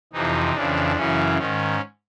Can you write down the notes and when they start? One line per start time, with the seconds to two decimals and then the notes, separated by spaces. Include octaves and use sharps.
0.13 F2 C3 E3 D#4
0.55 F2 C#3 E3 D4
0.96 F#2 C#3 E3 C#4
1.38 G#2 D#3 C#4